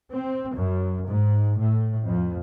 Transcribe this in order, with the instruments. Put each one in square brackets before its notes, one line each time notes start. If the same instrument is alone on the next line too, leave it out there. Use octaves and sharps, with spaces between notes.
[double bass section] C4
F#2
G#2
A2
F2